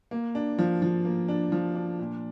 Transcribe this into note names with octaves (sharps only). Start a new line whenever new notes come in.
A#3
D4
F3
F3
A#3
D4
F3
D4
A#2